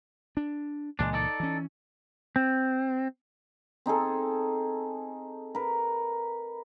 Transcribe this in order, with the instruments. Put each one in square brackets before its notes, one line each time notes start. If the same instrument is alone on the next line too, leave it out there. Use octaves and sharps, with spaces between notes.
[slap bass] D4
[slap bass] C#2 A#2 E3 [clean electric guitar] G#3 D4
[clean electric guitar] D#4 A4 D5
[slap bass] E3 C#4
[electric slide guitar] C4
[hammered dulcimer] C4 D#4 G#4 A4
A#4 B4